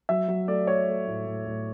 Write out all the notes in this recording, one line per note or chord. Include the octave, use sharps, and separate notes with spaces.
F#3 E5
F#3
A3 D5
A3 C#5
A3
A2
A2
A2